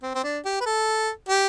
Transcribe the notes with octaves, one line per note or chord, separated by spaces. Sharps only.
C4
C4
D4
G4
B4
A4
G4